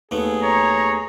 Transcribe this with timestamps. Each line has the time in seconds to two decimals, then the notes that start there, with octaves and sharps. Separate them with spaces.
0.11 D#2 A3 B3 G#4
0.44 C#5 A#5